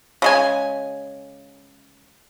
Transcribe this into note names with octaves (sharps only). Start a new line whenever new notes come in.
C#3 G#3 G#5